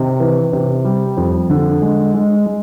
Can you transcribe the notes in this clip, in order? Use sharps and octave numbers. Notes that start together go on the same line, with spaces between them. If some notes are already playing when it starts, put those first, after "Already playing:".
Already playing: C3 D#3
E3
C3
G3
F2
D3
G#3
G#3
G#3